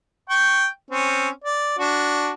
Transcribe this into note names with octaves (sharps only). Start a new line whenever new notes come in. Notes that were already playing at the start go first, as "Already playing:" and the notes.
G5 C#6
C4 C#4
D5
D4 F#4